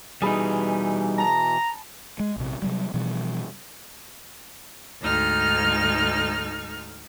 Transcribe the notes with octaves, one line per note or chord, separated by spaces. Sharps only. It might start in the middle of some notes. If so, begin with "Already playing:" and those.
B2 E3 G3 D#4 G#4 B5
A5 A#5
G#3
A#1 C3
C3 F#3 G3
B2 E3 F3 G3
D2 G#2 D#4 A4 F6